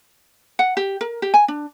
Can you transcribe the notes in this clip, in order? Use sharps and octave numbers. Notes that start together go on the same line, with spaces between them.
F#5
G4
A#4
G4
G#5
D4